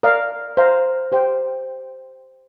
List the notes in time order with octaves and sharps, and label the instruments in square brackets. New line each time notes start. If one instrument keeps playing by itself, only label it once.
[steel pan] A#4 D5 F5
C5 F5 A#5
G4 C5 G5